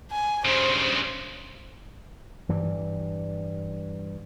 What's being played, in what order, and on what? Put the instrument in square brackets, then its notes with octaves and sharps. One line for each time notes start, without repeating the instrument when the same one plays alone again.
[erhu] G#5
[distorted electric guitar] G2 C#3 [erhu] C5
[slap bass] G2 E3 G3